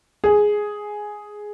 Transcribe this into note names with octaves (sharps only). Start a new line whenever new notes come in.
G#4